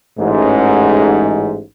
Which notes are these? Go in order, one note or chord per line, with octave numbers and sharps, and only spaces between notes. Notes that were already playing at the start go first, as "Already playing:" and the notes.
A1 G#2